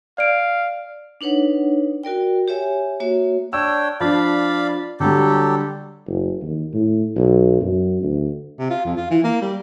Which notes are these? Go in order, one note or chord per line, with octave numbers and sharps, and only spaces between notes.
D5 F5 D7
D4 D#4 B4 C#5 F#5
F#4 A#4 D5 G5
G4 C#5 E5 G#5
A#3 F#4 C#5 E5
D4 C#5 G5 E6
F3 D4 D5 F5 B5
D3 F#3 G3 G4 A4
F#1
D#2
A2
B1
F#2
D2
C3
F4
F2
F4
E3
A#3
G3